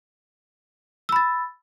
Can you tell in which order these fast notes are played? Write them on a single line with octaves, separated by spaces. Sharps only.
E6 B5 A6